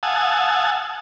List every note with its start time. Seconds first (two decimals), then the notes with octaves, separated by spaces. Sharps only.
0.03 F5 F#5 G#5 A5 D#6 E6